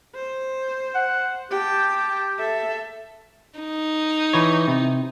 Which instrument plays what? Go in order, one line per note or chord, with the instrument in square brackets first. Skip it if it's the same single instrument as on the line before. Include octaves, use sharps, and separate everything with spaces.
[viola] C5
[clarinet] F#5
[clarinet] G4 [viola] G5 A5
[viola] A4 E5
[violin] D#4
[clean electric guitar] E3 C#5
C3